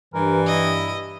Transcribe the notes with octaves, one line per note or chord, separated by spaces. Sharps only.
G2 E3 A#4
E4 D#5